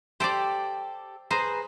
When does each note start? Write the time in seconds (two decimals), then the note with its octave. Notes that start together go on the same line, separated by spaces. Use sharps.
0.20 G4 A4 C5 D5 D6
1.31 G#4 B4 C5 A#5